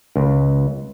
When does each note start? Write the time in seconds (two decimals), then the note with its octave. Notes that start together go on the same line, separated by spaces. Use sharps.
0.16 C#2